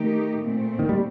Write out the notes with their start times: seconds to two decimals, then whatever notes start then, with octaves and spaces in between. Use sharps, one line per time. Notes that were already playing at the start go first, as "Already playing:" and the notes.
Already playing: D#3 A3 D#4 G4
0.39 A#2 A3 C4
0.79 D#3
0.89 G3